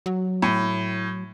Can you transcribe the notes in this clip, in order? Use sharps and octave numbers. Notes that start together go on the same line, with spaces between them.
F#3
A2